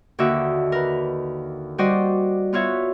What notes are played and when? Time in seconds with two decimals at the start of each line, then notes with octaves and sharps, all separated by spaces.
0.19 D#2 D3 D#4 F#4 E5
0.72 A#4 B4
1.78 G3 F#4 C5 D5 D#5
2.53 B3 F4 F#4 C#5 E5